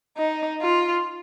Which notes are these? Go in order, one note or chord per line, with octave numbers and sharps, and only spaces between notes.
D#4
F4